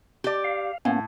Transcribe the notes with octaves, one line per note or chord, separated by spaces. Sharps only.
G4 D5
F5
A2 A#3 B3 C#4